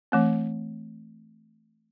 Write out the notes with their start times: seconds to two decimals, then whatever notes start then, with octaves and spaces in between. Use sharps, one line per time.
0.12 E3 A3 C4